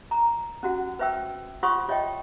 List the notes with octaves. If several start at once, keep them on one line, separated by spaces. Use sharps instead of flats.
A#5
C#4 F#4 F#5
B4 C5 E5 G5 E6
F4 C5 F#5 C6 C#6 D#6
F4 C#5 D#5 E5 G5